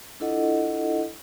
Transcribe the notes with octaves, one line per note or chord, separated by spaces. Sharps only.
D4 E4 F4 A4 D#5 F#5